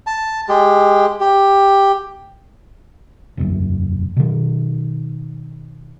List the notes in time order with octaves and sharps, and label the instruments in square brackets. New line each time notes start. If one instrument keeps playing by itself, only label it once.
[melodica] A5
G#3 G4
G4
[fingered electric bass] E1 B1 F#2
B2 D#3